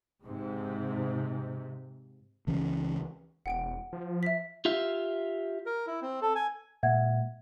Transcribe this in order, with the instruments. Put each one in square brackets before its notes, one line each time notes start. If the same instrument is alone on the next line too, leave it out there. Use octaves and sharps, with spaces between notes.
[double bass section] G#2 C3
[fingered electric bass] C#2 E3 C#4
[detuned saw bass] E1 [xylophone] F#5 G5 D7
[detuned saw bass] F3
[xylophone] E5 B6
[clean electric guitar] F4 G4 E5 F5
[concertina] A#4
E4
C4
A4
G#5
[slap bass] A#2 G#3 [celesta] E5 F#5 G#6